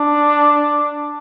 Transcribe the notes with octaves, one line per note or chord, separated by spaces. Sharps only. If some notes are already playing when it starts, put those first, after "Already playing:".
Already playing: D4